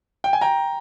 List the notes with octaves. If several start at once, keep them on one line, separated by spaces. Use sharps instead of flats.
G5
G#5
G5 A#5